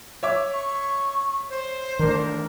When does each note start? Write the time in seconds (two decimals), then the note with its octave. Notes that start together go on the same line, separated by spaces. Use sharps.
0.23 C#5 E5 D6
0.52 C#6
1.49 C5
1.99 D#3 E3 A3 D4 A#4